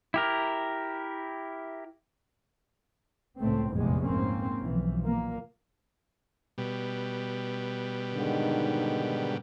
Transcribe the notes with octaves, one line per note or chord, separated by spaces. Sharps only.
E4 G4 A#4
C#2 A2 A3 C4
F1 A#1 E2 A2 C3 G#3
G#2 A#3 C4 C#4
B1 E3 F3
A#2 A#3
B2 G3
G#2 D3 D#3